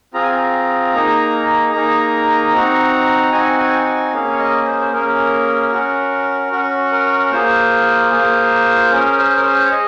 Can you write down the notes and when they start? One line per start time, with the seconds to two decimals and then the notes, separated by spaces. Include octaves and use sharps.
0.14 C4 F4 G#4 A#5
0.23 G#5
0.32 A#5
0.94 A#3 D#4 G#4
1.73 A#3 D#4 G#4 A#5
2.53 C4 D#4 F#4
3.32 C4 D#4 F#4 G#5
3.60 G#5
3.86 G#5
4.13 A#3 C#4 G#4 F5
4.32 C#5
4.39 D#5
4.66 C5
4.81 C5
4.92 A#3 C#4 G#4 A#4
5.72 C#4 F#4
6.52 C#4 F#4
6.92 A#4
7.31 A#3 F4 G#4 C5
8.11 A#3 F4 G#4
8.91 C#4 G#4 A#4
9.17 C5
9.36 A#4
9.45 C5
9.65 C#5
9.71 G#4 D#5